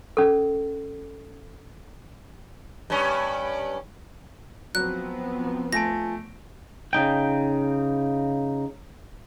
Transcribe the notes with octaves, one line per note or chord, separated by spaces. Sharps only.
C#4 A4
G2 C#4
F3 F#3 B3 C4 F#6
A3 F4 G#5 A5 A#6 D7
C#3 D#4 G5